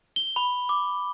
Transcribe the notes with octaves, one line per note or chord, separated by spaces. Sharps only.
G7
B5
D6